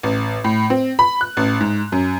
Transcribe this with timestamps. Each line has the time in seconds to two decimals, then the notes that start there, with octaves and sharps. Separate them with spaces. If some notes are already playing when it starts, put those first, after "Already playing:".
0.03 A1
0.44 A2
0.70 C4
0.99 B5
1.21 F#6
1.37 A1
1.60 G#2
1.92 F#2